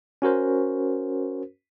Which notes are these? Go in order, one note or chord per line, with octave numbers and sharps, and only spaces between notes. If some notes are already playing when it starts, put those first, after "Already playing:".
C#4 F#4 A#4 C5